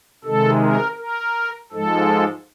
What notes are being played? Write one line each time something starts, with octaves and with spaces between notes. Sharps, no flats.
C3 D#3 G#3 A4
A#4
A#4
G#2 F3 G#3 A4